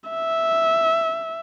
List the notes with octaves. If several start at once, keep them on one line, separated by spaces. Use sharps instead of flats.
E5